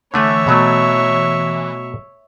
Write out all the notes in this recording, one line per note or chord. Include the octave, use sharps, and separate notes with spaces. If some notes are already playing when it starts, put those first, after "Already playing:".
D3 E3 A3 C#5 E5 G#5
B2 F#3 A3